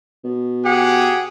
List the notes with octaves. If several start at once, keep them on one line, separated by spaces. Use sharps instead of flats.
B2
G4 G#4 F#5